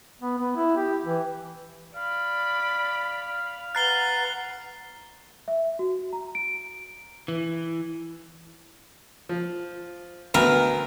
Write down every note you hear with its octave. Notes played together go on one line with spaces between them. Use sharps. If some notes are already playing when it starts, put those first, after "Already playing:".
B3
B3
E4
G4
E3
D5 F5 B5
B4 F#5 A#5 F#6 A6 C7 G7
E5
F#4
A#5
D7
E3
F3
D2 B3 A#4